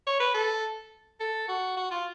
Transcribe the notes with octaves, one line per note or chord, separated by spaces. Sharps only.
C#5
B4
A4
A4
F#4
F#4
F4